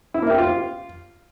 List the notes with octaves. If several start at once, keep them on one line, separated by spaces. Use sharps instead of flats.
E4
A#3
G4
F4